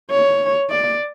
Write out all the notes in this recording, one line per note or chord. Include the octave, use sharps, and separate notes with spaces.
C#5
D5